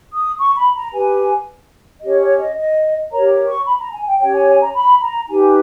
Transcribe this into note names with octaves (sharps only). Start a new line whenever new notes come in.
D#6
C#6
B5
A#5
G4 B4 G#5
C#4 G4 C#5 D#5
C#5
D#5
D#5
G4 A#4 C#5 A#5
C#6
B5
A#5
G#5
G5
C#4 G4 C#5 G5
G#5
G#5
A#5
B5
A#5
D#4 G4 B4 G#5